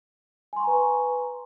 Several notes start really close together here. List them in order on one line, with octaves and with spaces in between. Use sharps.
G#5 C6 C#6 A#5 B4